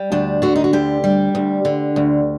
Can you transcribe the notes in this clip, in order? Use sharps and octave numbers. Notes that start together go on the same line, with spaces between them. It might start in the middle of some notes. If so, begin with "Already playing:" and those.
Already playing: G3
D2 D4
D3 F#4
D#4
F#4
D2 G4
G3
D2
D3
D2